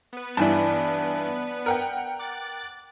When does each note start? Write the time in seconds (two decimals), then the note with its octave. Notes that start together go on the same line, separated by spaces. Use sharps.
0.13 B3 B4
0.37 G2 E3 E4 D5 G#5 A5
1.66 A#4 F#5 G5
2.19 D6 F#6 A6